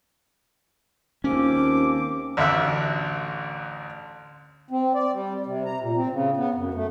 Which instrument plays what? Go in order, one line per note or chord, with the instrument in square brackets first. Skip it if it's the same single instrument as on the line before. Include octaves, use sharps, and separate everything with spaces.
[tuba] D#2 [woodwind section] F3 C4 D6 [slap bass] C#4
[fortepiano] A1 D2 E5 F#6
[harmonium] C4
D5
G3
C3
A#5
A#2
C4
C#3
B3
F#2
A3